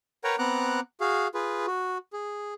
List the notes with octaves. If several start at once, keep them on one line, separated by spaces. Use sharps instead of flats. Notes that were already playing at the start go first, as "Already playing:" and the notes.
A#4 B4 C#5 F#5 G5 A#5
B3 C4 F#5 A#5 D6 F#6
F#4 G#4 F5
F4 G#4 B4
F#4
G#4